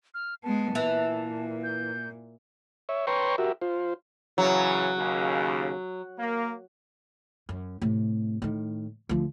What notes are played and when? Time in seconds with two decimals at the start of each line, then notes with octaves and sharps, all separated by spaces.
0.14 F6
0.43 G#3 B3 A5
0.75 A#2 E3
1.64 G6
2.89 C#5 E5
3.07 B4 C#5 G5 A#5 C6 C#6
3.38 F#4 G4 A#4 E5
3.62 F4 C5
4.38 C#3 E3 F#3
4.97 D#2 C#3
6.18 A#3
7.49 F#2
7.82 A2 C3
8.42 A2 D#3
9.09 D2 F3